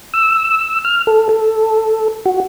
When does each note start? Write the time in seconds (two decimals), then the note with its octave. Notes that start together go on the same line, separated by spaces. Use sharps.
0.14 E6
0.85 F6
1.07 A4
1.29 A4
2.26 F#4